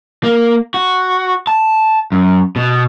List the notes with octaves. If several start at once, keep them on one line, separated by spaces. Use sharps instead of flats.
A#3
F#4
A5
F#2
B2